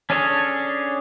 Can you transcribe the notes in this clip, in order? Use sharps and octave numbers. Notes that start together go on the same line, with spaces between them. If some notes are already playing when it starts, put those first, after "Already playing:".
C#4 D4 G#4 A4 C#5